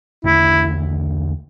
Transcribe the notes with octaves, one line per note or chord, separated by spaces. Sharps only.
E2 D3 A3 E4